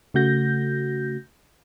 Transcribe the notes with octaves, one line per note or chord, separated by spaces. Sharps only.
C#3 A3 F#4 G6 A#6